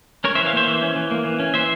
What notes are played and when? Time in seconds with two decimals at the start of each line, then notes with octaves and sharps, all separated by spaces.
0.24 C#4 A#4 C#5
0.35 C5 E5
0.38 E3
0.46 C#5 F5
0.53 A#3 C5 E5
0.68 E3
0.82 C#4
0.96 E3
1.11 A#3
1.25 E3
1.40 C#4
1.54 E3 C5 E5